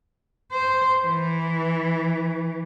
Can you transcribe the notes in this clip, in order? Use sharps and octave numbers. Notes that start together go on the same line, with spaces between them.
C5
E3